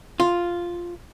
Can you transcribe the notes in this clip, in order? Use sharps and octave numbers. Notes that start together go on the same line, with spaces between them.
F4